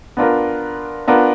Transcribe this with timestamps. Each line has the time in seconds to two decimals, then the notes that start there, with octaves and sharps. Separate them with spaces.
0.17 B3 D4 F4 A#4
1.08 B3 D4 F4 A#4